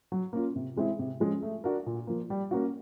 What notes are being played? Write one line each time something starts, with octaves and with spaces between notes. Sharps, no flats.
F#3
A#3 C#4 F4
C3
E3 G#3 C4 E4
C3
F3 G#3 C#4
A3
D4 F#4 A#4
A#2
F3 A#3
G3
A#3 C#4 F#4